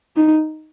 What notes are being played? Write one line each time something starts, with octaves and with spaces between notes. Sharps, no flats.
D#4